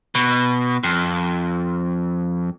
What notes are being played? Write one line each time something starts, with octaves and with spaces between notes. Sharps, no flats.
B2
F2